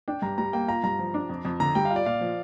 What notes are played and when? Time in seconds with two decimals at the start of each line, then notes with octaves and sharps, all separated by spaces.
0.08 D4 G5
0.22 G2 A#5
0.38 G3 A#5
0.53 A#3 G5
0.68 F4 A#5
0.83 G2 A#5
0.99 F3
1.14 D4
1.29 F2
1.45 F2
1.60 D3 A#5
1.75 G3 G5
1.85 F5
1.90 F4
1.96 D5
2.06 A#2 F5
2.21 F3